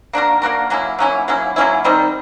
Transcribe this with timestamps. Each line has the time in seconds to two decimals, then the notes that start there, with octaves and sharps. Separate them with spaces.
0.13 A#3 D4 F#4 A#4
0.42 A#3 D4 F#4 A#4
0.70 F#3 A#3 C#4 E4
0.99 F#3 A#3 C#4 E4
1.28 F#3 A#3 C#4 E4
1.56 F#3 A#3 C#4 E4
1.84 D#3 G3 C4 D#4